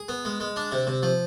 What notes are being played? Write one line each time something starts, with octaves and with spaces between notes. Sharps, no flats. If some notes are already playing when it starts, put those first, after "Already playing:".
Already playing: G#4
B3
G#3
G#3
D4
C3
C3
F3